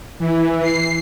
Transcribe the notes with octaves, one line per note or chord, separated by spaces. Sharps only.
E3
C7